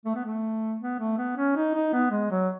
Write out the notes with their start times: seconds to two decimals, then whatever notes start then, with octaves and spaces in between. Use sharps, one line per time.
0.05 A3
0.15 B3
0.24 A3
0.81 B3
0.99 A3
1.18 B3
1.37 C#4
1.56 D#4
1.74 D#4
1.93 B3
2.11 G#3
2.31 F#3